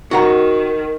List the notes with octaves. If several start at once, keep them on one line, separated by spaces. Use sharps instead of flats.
D#3 F#4 F#5 A#5